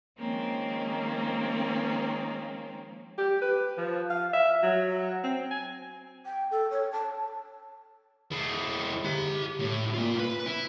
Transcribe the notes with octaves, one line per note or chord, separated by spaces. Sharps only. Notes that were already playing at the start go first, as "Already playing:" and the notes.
D#3 F3 G#3 A#3 C4 C#4
G4
B4
F3
F5
E5
F#3
C4
G#5
G5
A4
C#5
A5
G#3 E4
G4 A#5
A2
A#3 F4
B4
E4